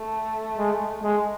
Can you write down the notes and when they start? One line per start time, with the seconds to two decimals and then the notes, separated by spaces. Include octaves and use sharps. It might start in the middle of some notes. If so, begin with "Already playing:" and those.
Already playing: A3
0.58 G#3
1.03 G#3